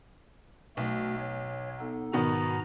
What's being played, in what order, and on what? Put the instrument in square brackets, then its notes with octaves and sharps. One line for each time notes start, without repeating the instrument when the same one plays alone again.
[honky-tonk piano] B1 [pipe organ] A3 F#4
[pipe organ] C#5
B3 D#4 A4
[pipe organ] G#2 A#5 A#6 [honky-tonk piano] B2 D#3 B3